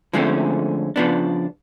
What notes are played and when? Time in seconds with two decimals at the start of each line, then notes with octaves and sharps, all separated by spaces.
0.13 D3 F3 G#3 A3 C4 C#4
0.96 C#3 F3 B3 D4